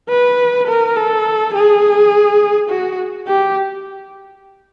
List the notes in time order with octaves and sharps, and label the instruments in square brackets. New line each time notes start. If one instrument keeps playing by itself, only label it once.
[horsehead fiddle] B4
A#4
A4
G#4
F#4
G4